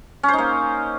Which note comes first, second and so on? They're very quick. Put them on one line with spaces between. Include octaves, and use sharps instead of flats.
C#4 C5 D#4 A#3